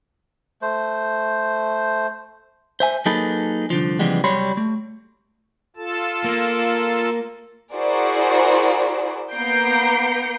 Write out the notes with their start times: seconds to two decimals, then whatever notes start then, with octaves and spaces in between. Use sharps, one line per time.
0.62 A3 C5
2.80 C5 E5 G#5
3.06 F#3 A#3 D#4 G#4 A4 B4
3.70 C2 D3 F3
3.99 C#3 E3 F3 G3 G#3 B3
4.24 C2 F#3 G3 C#5 B5 C6
4.57 A3
5.76 F4 A4 A5
6.24 A#3
7.73 E4 F#4 G#4 A#4 C5 D5
9.32 A#3 B3 A#5 G6 C7 D7